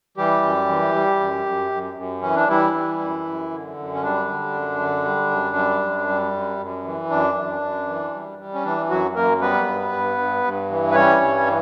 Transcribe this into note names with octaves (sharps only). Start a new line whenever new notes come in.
E3 G3 G4
F#2
E3
G3
F#2
F#2
F#2
F#2
E3 C#4
D4
E3 G3 E4
G3
F#2
F#2
D3
F#2
C#4
G3 D4
D3
F#2
D3
G3
F#2
G3
F#2
G3
F#2
F#2
E3
F#2 D4
F#2
F#2
E3
G3
G3
C#4
E3 D4
F#2 F#3 F#4
F#2 A#3 A#4
G3 B3 B4
G2
G2
G2
G2
E3
B4
G3 C#4 C#5
G2
E3